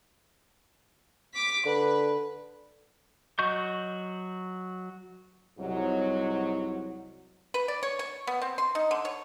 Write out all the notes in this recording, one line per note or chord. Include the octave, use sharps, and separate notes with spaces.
D6 B6
D3 B4
F#3 F#4 D#5 C#6 G6
C2 G#2 F#3
B4
D5
C#5
C#5
B3
C4
C6
D#4
D3
C#5